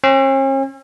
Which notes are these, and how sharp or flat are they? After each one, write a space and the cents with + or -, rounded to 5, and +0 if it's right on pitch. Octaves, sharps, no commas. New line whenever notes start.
C#4 -45